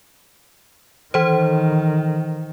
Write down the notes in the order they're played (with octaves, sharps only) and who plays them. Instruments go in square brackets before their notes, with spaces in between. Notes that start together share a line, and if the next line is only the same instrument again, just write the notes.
[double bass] D#3 [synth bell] E3 C5